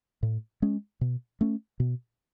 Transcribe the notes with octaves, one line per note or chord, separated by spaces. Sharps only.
A2
G#3 C#4
B2
A3 C#4
B2